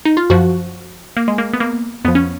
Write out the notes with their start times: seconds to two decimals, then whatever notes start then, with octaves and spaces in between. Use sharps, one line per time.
0.05 D#4
0.17 F4
0.30 F#2 F3 F#4
1.17 A#3
1.28 G#3
1.38 A#3
1.53 B3
1.60 A#3
2.04 F2 F3 B3
2.15 C#4